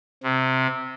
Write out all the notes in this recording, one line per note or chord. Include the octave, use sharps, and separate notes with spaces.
C3